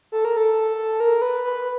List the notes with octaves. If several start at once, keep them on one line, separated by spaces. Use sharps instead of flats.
A4
A#4
A4
A#4
B4
B4